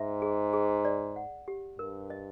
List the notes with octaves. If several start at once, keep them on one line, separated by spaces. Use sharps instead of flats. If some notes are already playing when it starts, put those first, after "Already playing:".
Already playing: G#2 E5
G#4
G#4
D5
F#5
G4
G2 A#4
D#5